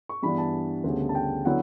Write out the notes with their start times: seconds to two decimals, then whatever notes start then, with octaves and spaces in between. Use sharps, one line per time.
0.09 C#6
0.22 G2 E3 G3 B3 D4 B5
0.38 A5
0.84 D2 C#3 G3 B3
1.09 A5
1.15 G5
1.45 D3 F#3 B3 E4 F#5